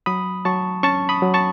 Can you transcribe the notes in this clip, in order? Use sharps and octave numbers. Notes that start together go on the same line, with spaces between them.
F#3 B5 D#6
F#3 A5 C#6
C#4 A5 C#6
B5 D#6
F#3
A5 C#6